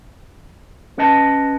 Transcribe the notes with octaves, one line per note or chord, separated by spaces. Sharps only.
C#4 B4 D#5 A5